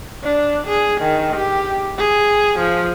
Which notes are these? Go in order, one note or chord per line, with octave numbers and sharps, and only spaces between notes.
D4
G#4
D#3
G4
G#4
F3